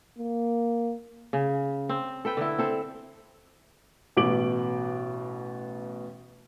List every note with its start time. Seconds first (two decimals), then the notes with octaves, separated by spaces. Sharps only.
0.18 A#3
1.33 C#3
1.89 C4
2.25 A4 B4 G5
2.37 D3 E4
2.58 C4 A4 C5
4.17 A1 B2 D6 D7 F#7